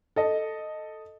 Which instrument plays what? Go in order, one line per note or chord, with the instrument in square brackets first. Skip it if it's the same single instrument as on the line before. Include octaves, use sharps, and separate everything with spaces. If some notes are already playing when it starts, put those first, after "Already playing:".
[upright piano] A4 D#5